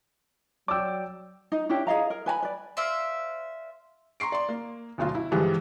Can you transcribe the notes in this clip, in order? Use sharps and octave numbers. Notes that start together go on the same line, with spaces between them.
F#3 D5 G5 D6 E6
D#4
C#4 D4 E4 G4
G#4 D#5 F5 A#5
A#4
B4 G#5 A5 B5
B4 D5
C5 D5 E5 F5
A#5 C6 C#6 C7 D7
D5 C6
A#3
D2 B2 F#3 F4 F5
E4
G2 D3 E3 F3 G3 G#3